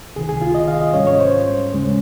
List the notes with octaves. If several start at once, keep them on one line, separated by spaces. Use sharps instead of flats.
C#2 C3 D#3 G#4
G#4
F4
D#5
F5
D#5
G#2 G3 C#4 C#5
C#5
C5
D#2 C#3 G#3 C#4